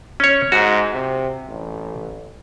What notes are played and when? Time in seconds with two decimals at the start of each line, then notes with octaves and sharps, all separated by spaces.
0.20 C#4 C#5
0.52 G#2 F#4
0.92 C3
1.48 A1